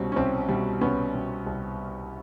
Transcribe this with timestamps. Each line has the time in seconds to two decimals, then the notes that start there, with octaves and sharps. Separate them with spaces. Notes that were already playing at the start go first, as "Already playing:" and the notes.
Already playing: C2 B2 G3 C4 C#4
0.12 C#4
0.16 C2 C4
0.49 B2 G3
0.81 C2 B3 C#4
1.14 B2 G3
1.46 C2